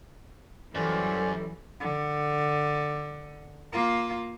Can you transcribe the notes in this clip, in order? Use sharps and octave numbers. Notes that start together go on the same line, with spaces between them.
F#2 E3 F#3 G3 C#4 A4 C5 D5
D3
A#3 F4